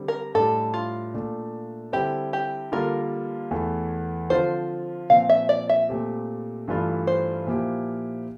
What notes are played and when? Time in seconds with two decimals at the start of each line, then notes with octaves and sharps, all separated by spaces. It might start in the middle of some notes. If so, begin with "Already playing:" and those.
Already playing: D3 G3 C4
0.08 A#4
0.34 A2 G3 D4 G4 A4
0.74 F4
1.14 A#2 A3 D4
1.93 D3 G3 C4 E4 G4
2.33 G4
2.72 D3 G3 A#3 F4 A#4
3.51 E2 E3 A3
4.30 D3 F3 C4 F4 C5
5.10 A#2 F3 C4 F5
5.29 E5
5.49 D5
5.69 E5
5.89 A#2 A3 C4 G4
6.68 G2 E3 A3 D4 F4
7.07 C5
7.47 A#2 F3 A#3 E4 G4